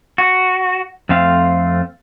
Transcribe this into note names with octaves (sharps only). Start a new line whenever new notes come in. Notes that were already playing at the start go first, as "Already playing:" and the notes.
F#4
F2 A3 C4 F5